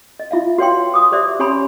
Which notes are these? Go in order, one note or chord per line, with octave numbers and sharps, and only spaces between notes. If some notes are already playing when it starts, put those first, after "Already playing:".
D#5
E4 F4 E5 F5
F#4 B4 C#5 F5 G5 C6
B4 D6 D#6
G4 C5 D5 E5
C#4 G4 C#5 G#5 B5 C6